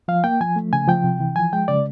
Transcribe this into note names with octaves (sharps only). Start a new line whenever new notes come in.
F3 F5
A#3 G5
F3 G#5
A3
C#3 G#5
F3 G5
C3
E3
F3 G#5
G#3 G5
C#3 D5